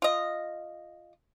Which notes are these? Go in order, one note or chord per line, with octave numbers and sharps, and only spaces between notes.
F4 D#5